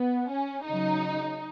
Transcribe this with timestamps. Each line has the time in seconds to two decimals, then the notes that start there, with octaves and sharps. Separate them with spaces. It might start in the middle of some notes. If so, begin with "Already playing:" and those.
Already playing: B3
0.29 C#4
0.65 C#3 F#3 D#4